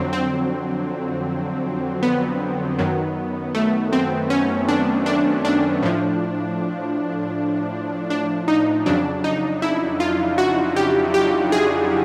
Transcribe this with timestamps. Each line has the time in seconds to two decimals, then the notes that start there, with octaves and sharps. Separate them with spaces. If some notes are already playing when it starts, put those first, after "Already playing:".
Already playing: F2 D3 F#3 C4
0.13 C4
2.03 B3
2.79 F#2 D#3 F#3
3.55 A3
3.93 C4
4.30 C#4
4.68 D4
5.06 D4
5.45 D4
5.83 A2 F3
8.10 D4
8.48 D#4
8.86 F2 C#3 F#3 D4
9.24 D#4
9.62 E4
10.00 F4
10.38 F#4
10.76 G4
11.14 G4
11.52 G#4